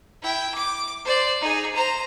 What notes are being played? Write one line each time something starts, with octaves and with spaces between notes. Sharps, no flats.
E4 G5
D6
C5 D5
D#4 G#4
C5 A#5